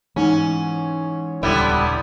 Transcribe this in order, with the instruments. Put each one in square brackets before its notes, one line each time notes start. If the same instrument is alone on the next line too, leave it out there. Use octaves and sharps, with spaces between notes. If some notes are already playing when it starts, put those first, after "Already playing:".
[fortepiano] G#2 [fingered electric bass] E3 [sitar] C#4
[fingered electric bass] D#1 C#2 [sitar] D3 B3 E4 [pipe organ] G3